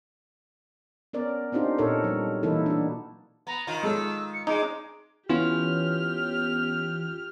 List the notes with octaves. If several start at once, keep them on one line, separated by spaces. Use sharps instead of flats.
B3 C#4 A#4 D5
C4 D4 D#4 F4 G4
A#2 D#4 A4 A#4 C#5
F#3 G3
B2 E3 A#3 D#4 E4 A4
D4 F#4
B3 A#5
D#3 F4
G#3 A4 E6
C#7
G#3 D#4 D6
E3 B3 C#4 F4 G4 F6